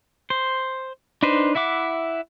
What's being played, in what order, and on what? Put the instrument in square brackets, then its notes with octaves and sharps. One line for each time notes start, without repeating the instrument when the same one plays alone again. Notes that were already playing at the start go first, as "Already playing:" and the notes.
[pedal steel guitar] C5
D4 D#4 B4 C5
E4 E5 F#5 D6